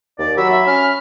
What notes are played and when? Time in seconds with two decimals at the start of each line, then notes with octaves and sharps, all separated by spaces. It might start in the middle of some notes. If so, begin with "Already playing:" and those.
0.19 D#2 D5
0.37 F#3 B5 E6
0.50 E5
0.67 C#4 F6